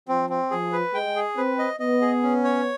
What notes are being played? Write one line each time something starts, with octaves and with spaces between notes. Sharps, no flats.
F3 C4
C4
F3 G#4
B4
G#3 G5
G#4
C4 B4
D#5
B3 D#5
G#4
C#4
C#5